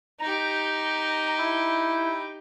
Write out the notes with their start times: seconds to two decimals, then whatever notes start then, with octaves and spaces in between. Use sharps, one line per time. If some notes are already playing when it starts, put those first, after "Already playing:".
0.20 D#4 G4 A#5
1.38 E4